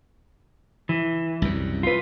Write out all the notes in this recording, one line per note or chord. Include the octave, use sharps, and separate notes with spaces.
E3
C2 F#2
F4 B4